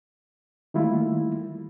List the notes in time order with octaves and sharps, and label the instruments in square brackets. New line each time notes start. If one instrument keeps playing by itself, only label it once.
[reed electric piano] D#3 G3 A3 A#3 E4 F4